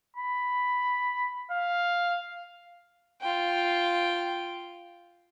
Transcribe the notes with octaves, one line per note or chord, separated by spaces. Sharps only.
B5
F5
F4 G5